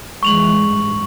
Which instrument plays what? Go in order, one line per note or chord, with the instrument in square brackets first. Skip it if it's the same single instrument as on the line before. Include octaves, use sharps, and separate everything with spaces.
[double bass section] F2 E3 G#3 [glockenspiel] C#6 F7 F#7
[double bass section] A1 G2